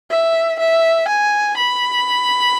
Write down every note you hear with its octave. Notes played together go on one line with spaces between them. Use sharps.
E5
E5
G#5
B5